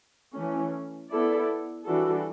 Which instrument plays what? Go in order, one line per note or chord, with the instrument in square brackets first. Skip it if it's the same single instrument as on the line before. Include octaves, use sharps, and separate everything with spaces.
[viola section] E3 A3 C#4
B3 E4 A4 D5
E3 G3 D4 F#4 A4